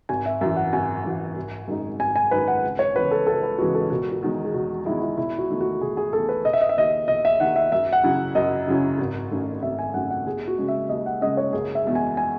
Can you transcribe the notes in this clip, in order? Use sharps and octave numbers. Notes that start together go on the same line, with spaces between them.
G#1 G#5
E5
F#2 E3 E5
F#5
G#1 G#5
F#2 E3
G#1
F#2 D#3 G#3 D#4
G#1 G#5
G#5
F#2 D#3 G#3 D#4 B4
F#5
C#2
C#5
C#3 E3 G#3 B3 B4
A4
C#2 A4
B4
C#3 E3 G#3 B3 F#4
A4
E1 F#4
F#4
E2 D#3 G#3
G#4
E1 F#4
E2 D#3 G#3 E4
E4
E1 E4
F#4
E2 D#3 A3
F#4
E1 G#4
G#4
E2 D#3 A3 A4
B4
E1 D#5
E5
D#5
E5
D#2 D#3 D#5
E1 D#5
E5
D#2 D#3 F#5
E5
F#2 E5
F#5
C#3 F#3 C#4 E4
F#2 D#5
C#3 F#3 C#4 E4
G#1
F#2 D#3 A3 C#4
G#1 E5
G#5
F#2 D#3 A3 C#4 F#5
F#5
D#2 G#4
F#4
C#3 G#3 C#4
E5
D#2 D#5
F#5
C#3 G#3 C#4 D#5
C#5
F#1 G#4
E5
E2 B2 G#3
G#5
G#5